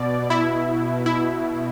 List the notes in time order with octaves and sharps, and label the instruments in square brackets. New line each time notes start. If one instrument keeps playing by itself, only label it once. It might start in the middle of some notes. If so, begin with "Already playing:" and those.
Already playing: [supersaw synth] B2 D5
E4
E4